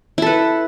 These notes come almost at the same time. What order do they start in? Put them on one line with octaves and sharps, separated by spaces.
E4 A4 B4